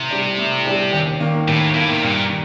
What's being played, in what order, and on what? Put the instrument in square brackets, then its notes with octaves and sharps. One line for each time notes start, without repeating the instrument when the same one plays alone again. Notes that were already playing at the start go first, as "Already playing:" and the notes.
Already playing: [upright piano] A2 [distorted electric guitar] C3
[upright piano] G3 D4
A2
G3 D4
D#2
D#3 A#3
[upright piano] D#2 [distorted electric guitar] A2
[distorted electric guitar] A2 [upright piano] D#3 A#3
[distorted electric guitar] C3
[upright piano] G2 [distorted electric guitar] A#2
[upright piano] D#3